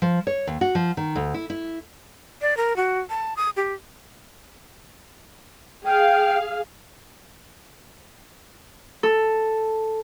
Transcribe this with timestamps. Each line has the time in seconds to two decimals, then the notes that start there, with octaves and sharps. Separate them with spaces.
0.02 F3
0.27 C#5
0.47 D#2
0.61 F#4
0.75 F3
0.97 D#3
1.16 D2
1.34 E4
1.50 E4
2.42 D5
2.57 A#4
2.76 F#4
3.10 A5
3.37 D#6
3.57 G4
5.85 G#4 F5 G5
9.03 A4